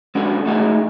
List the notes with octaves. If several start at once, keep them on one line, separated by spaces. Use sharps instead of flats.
G#3 B3 C#4 D4 F#4 A4
A3 D#4 F#4 G#4